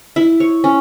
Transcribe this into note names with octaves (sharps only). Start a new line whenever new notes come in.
E4
C#5
C#4